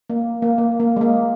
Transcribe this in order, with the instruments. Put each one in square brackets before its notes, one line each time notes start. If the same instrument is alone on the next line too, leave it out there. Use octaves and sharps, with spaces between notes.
[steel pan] A#3
A#3
A#3
A#3
G#3
A#3